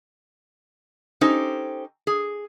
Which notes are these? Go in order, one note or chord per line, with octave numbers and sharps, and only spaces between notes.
C#4 D#4 G4 A4 C5
G#4